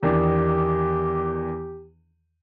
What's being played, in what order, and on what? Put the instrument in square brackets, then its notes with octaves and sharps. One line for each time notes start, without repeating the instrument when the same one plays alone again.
[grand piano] E2 D#3 D4 [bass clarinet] G4